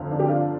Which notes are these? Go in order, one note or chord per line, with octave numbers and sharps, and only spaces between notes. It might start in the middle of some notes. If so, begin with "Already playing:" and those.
Already playing: G1 F2 D3 F3
D4
G4
D4 F4